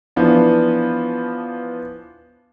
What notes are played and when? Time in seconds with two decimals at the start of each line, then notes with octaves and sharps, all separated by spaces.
0.16 E3 F3 B3 D4